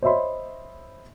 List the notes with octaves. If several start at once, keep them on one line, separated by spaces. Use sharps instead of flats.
C5 C#5 D#5 E5 B5 C6